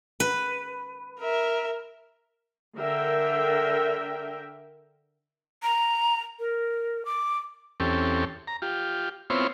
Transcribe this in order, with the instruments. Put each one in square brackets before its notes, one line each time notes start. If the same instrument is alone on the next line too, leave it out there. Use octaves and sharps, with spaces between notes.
[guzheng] B4
[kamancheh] A#4 E5
[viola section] D3 A#4 E5 G5
[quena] A#5
A#4
D6
[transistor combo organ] E2 C4 C#4 G4 A4
A#5
F4 G4
B3 C4 E4 F4 C5 C#5